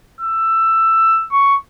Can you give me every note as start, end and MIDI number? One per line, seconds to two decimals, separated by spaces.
0.21 1.26 88
1.32 1.56 85